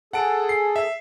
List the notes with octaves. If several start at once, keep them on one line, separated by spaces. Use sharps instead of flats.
G#4 A4 F#5 A5 D7
C7
E5